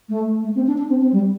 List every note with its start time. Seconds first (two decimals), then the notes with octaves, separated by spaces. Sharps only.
0.09 A3
0.44 A3
0.55 C4
0.67 D4
0.78 D4
0.89 C4
1.02 C4
1.13 G3